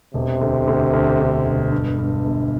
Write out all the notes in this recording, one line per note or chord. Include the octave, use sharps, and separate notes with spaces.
E1 C3
D2
D2
D2
D3
E1
G2
G2
G1